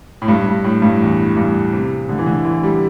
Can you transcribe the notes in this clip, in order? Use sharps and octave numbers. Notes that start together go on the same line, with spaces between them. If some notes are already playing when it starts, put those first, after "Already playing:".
A2
G2
G2
A2
G2
E2
G2
C3
D3
E3
D3
E3
G3